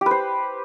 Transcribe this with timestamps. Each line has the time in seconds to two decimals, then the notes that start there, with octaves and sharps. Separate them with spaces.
0.01 G4
0.06 B4
0.11 C5